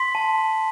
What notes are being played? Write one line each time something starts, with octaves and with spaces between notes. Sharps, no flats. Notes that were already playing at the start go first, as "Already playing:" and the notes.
Already playing: C6 B6
A5
C6